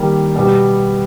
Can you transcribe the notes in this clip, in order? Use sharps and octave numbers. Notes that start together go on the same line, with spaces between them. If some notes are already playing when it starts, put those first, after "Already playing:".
Already playing: D#3 G3 A#3
B2 G3 B3